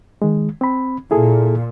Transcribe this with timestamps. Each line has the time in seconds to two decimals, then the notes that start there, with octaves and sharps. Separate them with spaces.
0.22 D#3 G#3
0.61 C4 B5
1.11 A#2 E4 G#4 A4